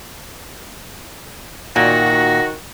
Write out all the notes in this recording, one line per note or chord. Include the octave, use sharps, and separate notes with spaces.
A#2 D#3 F#4 A#6